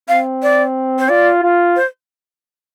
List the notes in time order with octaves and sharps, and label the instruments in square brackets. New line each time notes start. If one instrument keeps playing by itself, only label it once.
[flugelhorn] C4 [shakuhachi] F5
[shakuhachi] D5
C5
[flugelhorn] F4 [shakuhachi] D5
[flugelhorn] F4
[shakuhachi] C5